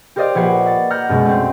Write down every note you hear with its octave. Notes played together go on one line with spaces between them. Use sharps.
G4 A#4 C5 D5 D#5 F5
A#1 B4 F#5 G#6 C7
A6
F#5 A#5 F6 G6 A#6
F#2 B2 G#3
A3 C4